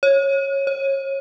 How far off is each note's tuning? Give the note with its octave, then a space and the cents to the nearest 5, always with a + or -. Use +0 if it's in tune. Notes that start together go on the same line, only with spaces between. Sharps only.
C#5 -15
C#5 -30